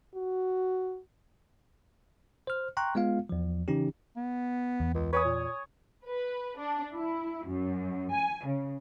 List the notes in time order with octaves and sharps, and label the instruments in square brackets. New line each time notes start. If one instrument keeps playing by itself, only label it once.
[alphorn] F#4
[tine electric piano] C5 F6
G5 A#5 C6 C#6 F#6
G#3 B3 F4 F5
E2 F3
C#3 E3 C#4 D#4 G4
[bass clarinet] B3
[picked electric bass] E2
[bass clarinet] C#2
[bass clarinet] B4 [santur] C#5 G#5 D#6
[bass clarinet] A#2
[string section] B4
D4
E4
F#2
G#5
C#3